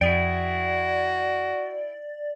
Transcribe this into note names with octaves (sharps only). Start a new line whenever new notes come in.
F2 E4 F#4 G#4 D5 G5